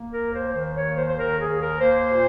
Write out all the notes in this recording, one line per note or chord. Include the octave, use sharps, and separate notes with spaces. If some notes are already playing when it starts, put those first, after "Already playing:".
Already playing: A#3
A#4
D#2
C5
D#3 C5
C#5
D#2
C5
C5
D#3 A#4
G#4
D#2
A#4
A#3 C5
A#2